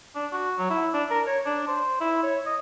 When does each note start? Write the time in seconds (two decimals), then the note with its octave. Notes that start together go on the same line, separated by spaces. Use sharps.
0.15 D4
0.32 F#4
0.58 F#3
0.70 E4
0.94 D4
1.11 A#4
1.26 C#5
1.46 D4
1.68 C5
2.01 E4
2.23 C#5
2.46 D#5